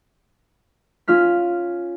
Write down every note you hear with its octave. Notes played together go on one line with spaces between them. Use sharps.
C#4 F4 F6 B6